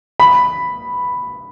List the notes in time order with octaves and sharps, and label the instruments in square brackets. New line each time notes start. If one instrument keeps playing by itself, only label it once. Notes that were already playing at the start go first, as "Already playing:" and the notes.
[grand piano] B5